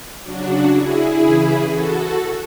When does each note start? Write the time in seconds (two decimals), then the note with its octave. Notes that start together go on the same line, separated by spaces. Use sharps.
0.23 C#3 F#3 D4 F#4
0.72 E4 G#4
1.21 C#3 E3
1.70 F#4 A4